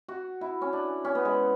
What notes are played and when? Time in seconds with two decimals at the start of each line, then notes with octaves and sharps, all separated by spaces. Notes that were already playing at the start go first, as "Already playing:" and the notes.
0.08 F#4
0.41 E4
0.62 C#4
0.73 D4
1.04 C#4
1.15 B3
1.25 G#3